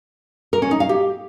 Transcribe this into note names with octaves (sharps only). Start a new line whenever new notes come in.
A#4
C#4
D#4
F5
G4